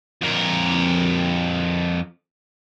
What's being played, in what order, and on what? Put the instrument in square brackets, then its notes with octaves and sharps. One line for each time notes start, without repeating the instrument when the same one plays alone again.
[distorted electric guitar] F2 A#4